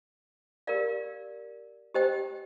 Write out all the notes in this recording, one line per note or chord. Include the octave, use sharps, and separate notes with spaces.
G4 A#4 D5 F5
G4 C5 D#5 G5